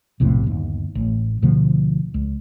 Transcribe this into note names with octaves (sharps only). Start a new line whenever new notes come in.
B1 F2 A2 C3
G1 D#2
A1
D2 B2 D3 F3
C#2